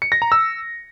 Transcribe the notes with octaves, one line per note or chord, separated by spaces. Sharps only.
C#7
A#6
A#5
E6